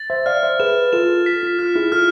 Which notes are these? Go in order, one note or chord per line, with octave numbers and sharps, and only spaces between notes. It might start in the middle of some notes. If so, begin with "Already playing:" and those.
Already playing: A6
C5 E5
D5 F5 F6
C5 E5
G#4 B4 E7
F4 A4 E7
B6
F4
F4 F6
E4 G#4
F4 A4 F6